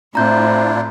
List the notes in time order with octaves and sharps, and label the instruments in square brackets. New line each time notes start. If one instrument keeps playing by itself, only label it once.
[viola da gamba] A2 [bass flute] C4 [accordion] D4 E4 F4 [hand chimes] A#5 G6